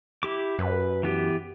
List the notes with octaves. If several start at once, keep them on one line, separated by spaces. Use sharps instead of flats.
E4 G4 D6
F#2 B4
E3 B3 G4